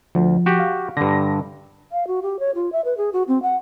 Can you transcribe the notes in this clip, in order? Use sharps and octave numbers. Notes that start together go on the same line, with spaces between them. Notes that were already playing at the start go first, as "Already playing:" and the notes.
D2 F3
F#4 G4
F5
G2 D3 A#6
F5
F#4
G4
C#5
F4
E5
B4
G#4
F#4
C4
F#5